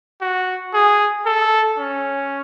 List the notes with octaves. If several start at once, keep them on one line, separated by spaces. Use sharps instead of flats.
F#4
G#4
A4
C#4